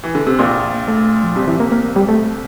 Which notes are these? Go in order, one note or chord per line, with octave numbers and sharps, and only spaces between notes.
E3
D3
C3
A#1 A#2 A#3
A3
F3
C2 C3 G3
E3
A#3
A#3
G3
A3